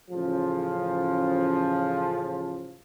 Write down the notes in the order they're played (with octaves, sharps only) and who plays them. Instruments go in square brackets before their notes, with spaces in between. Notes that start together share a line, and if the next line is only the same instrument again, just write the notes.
[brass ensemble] A1 C#3 F3